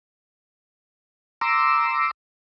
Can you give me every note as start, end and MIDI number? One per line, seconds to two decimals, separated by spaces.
1.41 2.11 82
1.41 2.11 84
1.41 2.11 86
1.41 2.11 88